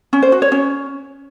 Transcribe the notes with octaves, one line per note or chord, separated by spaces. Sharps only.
C#4
C5
F#4
C#5
C#4